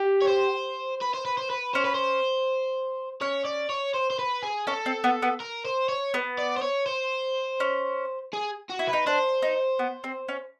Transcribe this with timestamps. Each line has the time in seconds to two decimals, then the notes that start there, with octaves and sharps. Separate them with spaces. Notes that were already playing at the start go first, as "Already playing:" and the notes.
Already playing: G4
0.22 C#5
0.28 C5
1.01 B4
1.14 C5
1.25 B4
1.38 C5
1.50 B4
1.74 C#4 C5
1.85 B4
1.95 C5
3.21 C#4 C#5
3.45 D5
3.70 C#5
3.94 C5
4.10 C5
4.19 B4
4.43 G#4
4.67 C#4 A4
4.86 C4
5.04 B3
5.22 B3
5.40 A#4
5.65 C5
5.89 C#5
6.14 B3
6.39 D5
6.57 C5
6.62 C#5
6.86 C5
7.60 C#4
8.33 G#4
8.70 F#4
8.79 E4
8.88 B4
8.93 D#4
9.07 D4 C5
9.42 D#4
9.79 B3
10.04 C4
10.28 C#4